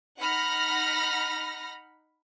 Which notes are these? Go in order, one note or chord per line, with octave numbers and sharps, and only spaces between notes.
D#4 F#5 B5 F6 A#6